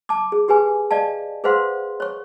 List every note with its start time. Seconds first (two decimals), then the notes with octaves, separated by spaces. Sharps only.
0.09 A5 D6
0.32 G#4
0.48 G4 G#4 B4 G#5
0.91 D5 D#5 F5 A5
1.44 G#4 B4 C5 F5 F#5 C6
2.00 C#5 C#6